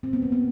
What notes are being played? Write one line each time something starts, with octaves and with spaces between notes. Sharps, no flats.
A#2 C4
B3
A#3
B3